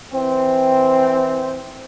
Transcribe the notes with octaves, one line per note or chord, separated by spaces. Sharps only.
E3 C4